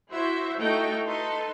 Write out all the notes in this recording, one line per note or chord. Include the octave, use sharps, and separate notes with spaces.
E4 F#4 C5 E5
A3 D#4 E4 F#4 G5
D#4 A4 B4 C6